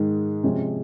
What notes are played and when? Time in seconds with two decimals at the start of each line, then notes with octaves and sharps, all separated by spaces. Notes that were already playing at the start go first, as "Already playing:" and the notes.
Already playing: G#2 D#3 G#3 D#4
0.43 C3 F3 G#3 C#4